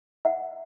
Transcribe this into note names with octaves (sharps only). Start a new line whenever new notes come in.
E5 F#5